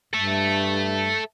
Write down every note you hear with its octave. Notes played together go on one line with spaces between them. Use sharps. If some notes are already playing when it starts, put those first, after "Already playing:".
G2 A4 E5